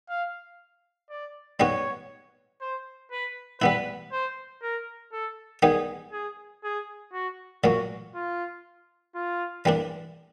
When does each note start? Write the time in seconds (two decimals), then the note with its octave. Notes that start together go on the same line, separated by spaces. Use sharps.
0.09 F5
1.10 D5
1.60 G3 B3 D#4 F#4 C#5
2.61 C5
3.11 B4
3.61 G3 B3 E4 B4
4.12 C5
4.62 A#4
5.12 A4
5.62 D#3 G3 B3 D#4 G#4
6.12 G#4
6.64 G#4
7.13 F#4
7.64 A#2 F#3 A#3 F#4
8.14 F4
9.15 F4
9.65 E3 G3 A#3 D4